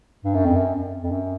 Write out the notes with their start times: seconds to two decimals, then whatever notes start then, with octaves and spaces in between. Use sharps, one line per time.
0.25 G2
0.35 F#2
0.45 F2
0.55 F#2
1.03 F2
1.11 F#2